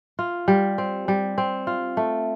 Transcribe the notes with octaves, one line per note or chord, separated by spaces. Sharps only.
F4
G3
C4
G3
C4
F4
A3